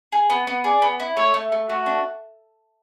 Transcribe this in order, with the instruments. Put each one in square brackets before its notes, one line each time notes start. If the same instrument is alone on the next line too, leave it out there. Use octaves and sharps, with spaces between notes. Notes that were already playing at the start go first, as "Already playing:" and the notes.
[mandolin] G#4
B3
B3
[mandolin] G#4 [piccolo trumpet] D5
[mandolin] B3
E4
[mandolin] A3 [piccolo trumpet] C#5
[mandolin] A3
A3
[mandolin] A3 [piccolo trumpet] F#4
[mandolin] D4